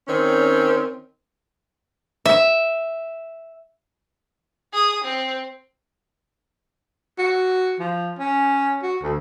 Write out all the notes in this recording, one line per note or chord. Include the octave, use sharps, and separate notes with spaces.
D#3 C4 C#4
E5
G#4 D#6
C4
F#4
F3
C#4
F#4
D2